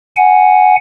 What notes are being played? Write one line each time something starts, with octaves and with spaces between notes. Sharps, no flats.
F#5 G#5